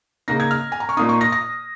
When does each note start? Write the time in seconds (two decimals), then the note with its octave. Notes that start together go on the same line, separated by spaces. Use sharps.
0.28 C#3 A#3 D#4 A#6
0.40 G#6
0.51 F6
0.72 G#5
0.80 A#5
0.89 C#6
0.97 A#2 A#3 D#4 D#6
1.09 C#6
1.21 A#6
1.32 A#6